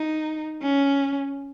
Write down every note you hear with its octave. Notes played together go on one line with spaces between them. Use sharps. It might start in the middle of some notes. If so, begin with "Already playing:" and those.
Already playing: D#4
C#4